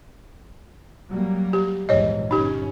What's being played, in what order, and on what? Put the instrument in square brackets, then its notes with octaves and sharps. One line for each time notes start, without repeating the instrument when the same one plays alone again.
[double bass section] F#3 G3 A#3
[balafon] G4
[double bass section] A#1 E2 G#2 [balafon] C#5 D#5
[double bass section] G1 C#4 [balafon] D#4 G4